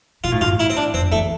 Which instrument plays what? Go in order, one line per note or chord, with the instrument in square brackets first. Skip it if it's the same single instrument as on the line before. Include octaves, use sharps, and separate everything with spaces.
[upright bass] B2 [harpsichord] F4
[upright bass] A2
[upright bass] G2 [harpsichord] F4
[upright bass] A2
[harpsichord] E4
C4
D4
[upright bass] F2 [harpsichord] C4
[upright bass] E3 [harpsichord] A3